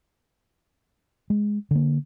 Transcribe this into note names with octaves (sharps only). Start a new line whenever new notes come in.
G#3
D3 A#3